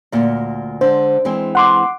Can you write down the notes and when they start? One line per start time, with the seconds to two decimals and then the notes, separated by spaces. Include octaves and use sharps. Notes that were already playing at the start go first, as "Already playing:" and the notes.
0.12 D2 A#2
0.81 D3 G#3 C5
1.25 E3 G#3 C4
1.55 F#5 C6 D6